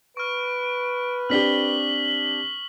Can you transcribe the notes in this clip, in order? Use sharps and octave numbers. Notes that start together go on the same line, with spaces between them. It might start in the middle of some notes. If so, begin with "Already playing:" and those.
B4 C#6 F6 D7
C4 D4 G4 F6 B6 F#7 G7